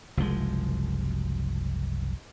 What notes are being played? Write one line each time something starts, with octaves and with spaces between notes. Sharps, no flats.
F#1 C2 F3 G#3